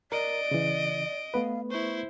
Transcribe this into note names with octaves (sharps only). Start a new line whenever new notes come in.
A#4 D5 D#5 D7
C#3 E3
A3 B3 B4 F5
E4 C5 C#6